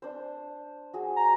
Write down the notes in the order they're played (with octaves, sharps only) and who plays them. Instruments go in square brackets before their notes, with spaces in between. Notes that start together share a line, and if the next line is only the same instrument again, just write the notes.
[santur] D4 C5
F#4 G#4
[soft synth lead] A#5